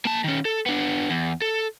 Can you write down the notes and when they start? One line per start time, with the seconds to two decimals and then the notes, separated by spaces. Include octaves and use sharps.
0.05 A#3 A5
0.24 D#3 C#4
0.45 A4
0.66 B3 D4
1.10 E2
1.42 A4